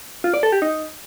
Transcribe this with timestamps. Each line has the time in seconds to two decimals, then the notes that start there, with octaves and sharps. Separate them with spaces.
0.24 F4
0.34 D5
0.43 A4
0.52 G4
0.62 D#4